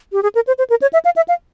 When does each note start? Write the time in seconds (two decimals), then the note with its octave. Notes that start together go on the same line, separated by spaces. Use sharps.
0.13 G4
0.23 G#4
0.35 A#4
0.47 C5
0.58 C5
0.70 A#4
0.82 C#5
0.93 E5
1.05 F5
1.16 E5
1.28 F5